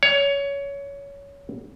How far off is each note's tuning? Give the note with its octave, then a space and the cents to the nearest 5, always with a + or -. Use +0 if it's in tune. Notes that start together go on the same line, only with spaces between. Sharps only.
C#5 +20